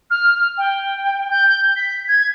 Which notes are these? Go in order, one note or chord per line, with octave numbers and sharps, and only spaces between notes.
F6
G5
G6
B6
G#6